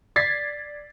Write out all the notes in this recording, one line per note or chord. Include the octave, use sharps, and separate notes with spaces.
D5 G#6 A6 B6 C7